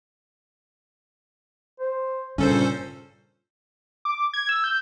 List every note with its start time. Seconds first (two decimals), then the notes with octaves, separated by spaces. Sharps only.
1.80 C5
2.38 G2 A#2 C#3 C#4 A4 C5
4.05 D6
4.33 G#6
4.49 E6
4.64 G6